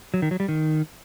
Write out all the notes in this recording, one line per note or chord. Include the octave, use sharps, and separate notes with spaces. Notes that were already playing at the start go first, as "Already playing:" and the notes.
F#3
D#3
F#3
G3
D#3